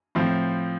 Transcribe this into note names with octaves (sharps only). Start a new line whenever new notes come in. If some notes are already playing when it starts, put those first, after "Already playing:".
A2 F3 C4